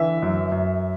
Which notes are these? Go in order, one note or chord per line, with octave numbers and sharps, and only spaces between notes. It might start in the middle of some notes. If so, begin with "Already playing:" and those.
Already playing: D3 E3 E5
F#2
F#2